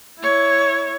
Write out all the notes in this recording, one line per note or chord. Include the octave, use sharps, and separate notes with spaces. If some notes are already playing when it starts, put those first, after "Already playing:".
E4 C#5